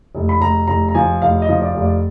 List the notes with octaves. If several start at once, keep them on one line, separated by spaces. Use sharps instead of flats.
F1
B5
F1 A#5
F1 A#5
A#5
F3 G#5
F1 F5
D#5
F3
D5
F1
D5